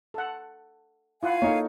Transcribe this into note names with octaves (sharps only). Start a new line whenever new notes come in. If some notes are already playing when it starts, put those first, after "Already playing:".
A4 F#5
E4 F4 F5 F#5 G#5
A#3 D#4 A4 C#5